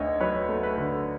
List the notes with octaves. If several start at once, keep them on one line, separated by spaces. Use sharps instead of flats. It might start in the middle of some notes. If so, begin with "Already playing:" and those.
Already playing: D2 D3 A3 C#5 D#5
F#3 B4 C#5
A3
B4
D3